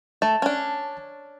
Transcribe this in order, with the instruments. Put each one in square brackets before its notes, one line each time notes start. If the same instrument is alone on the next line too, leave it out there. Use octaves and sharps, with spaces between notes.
[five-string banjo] A3 [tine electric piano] A5
[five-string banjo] C#4 D4